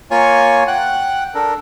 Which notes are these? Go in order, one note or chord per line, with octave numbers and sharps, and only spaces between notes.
A#3 F4 C#5 G#5 C#6
F#5 G5 F#6
D4 A4 A#4